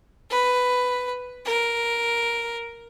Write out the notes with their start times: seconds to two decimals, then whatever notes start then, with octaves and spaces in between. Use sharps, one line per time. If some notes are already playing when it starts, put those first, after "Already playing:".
0.30 B4
1.45 A#4